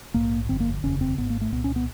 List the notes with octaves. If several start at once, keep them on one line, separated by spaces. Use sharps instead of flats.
A#1 G#2 A#3
G1 F2 D3 C4
A#3
F1 D#2 C#3 C#4
C4
G#1 G#2 B3
A#3
A3
C2 A#2 B3
C#4
B3